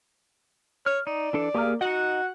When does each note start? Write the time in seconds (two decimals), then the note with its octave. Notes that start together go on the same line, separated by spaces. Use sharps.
0.86 C#5 F6
1.07 D#4 D5
1.33 E3 D4 A4
1.54 A#3 G4 G#4 F6
1.81 D#4 F#4 D#5 F#5